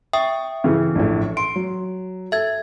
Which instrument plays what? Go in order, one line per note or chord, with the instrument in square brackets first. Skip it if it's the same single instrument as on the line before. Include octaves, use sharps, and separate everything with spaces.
[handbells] E5 G5 D#6 [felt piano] C#6
[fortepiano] C#3 E3
[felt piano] A#1 A2
[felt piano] C6 [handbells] D7
[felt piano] F#3
[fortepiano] A4 [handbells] E5 G#6